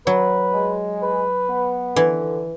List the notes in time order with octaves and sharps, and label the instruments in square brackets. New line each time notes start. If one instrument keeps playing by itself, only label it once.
[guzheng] F#3 [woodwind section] B4
[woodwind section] G#3
B4
B3
[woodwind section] D3 [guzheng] E3